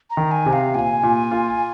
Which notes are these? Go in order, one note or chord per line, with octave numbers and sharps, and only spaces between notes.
A#5
D#3
G#5
C3
F5
A#2 G#5
A#2
F4